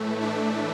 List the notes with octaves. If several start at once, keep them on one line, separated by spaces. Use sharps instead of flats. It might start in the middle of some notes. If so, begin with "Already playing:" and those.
Already playing: A2 E3 A3
D4